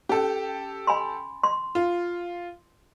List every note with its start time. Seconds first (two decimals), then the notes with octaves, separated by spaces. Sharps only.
0.09 C#4 G4 A4
0.87 G#5 B5 C6
1.43 C6
1.75 F4